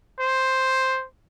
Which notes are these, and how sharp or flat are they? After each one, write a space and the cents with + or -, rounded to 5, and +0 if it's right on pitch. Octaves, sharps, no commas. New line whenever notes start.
C5 +5